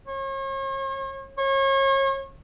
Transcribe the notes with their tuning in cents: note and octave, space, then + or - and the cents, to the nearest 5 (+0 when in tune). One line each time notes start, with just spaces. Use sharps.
C#5 -40
C#5 -35